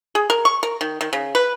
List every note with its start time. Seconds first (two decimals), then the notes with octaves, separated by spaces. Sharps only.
0.15 G#4
0.30 A#4
0.45 C#6
0.63 A#4
0.81 D#3
1.01 D#3
1.13 C#3
1.35 B4